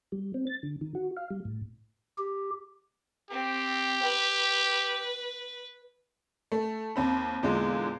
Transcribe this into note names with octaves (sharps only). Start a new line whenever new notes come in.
G3
C4
A6
D3
D#3
F#4
F5
G3
A2
G4
C4 G4
B4
A3
D#2 C4 B5
E2 A#2 D3 G#3